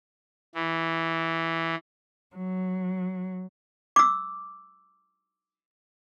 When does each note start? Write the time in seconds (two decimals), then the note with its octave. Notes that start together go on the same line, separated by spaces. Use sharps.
0.55 E3
2.36 F#3
3.96 D6 E6